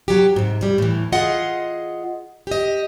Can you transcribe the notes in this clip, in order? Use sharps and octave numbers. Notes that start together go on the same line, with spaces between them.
F#3 G4
G#2 C3
A2 G3
A2 E3
F4 G#4 D#5 F#5
G4 D#5